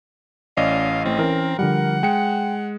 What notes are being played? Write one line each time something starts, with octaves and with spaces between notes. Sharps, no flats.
A1 C#4 D5 D#5 F5
E3 A3 C4
E3 C#4 A#4
D3 F3 G3 F#5
G#3 G5 C#7